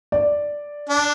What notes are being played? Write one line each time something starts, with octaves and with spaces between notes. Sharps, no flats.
D5
D4